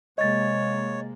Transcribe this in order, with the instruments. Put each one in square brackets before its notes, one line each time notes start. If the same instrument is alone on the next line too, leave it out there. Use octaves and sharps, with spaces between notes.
[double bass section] C3 G#3 A#3 [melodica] C#5 [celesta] D#5 A6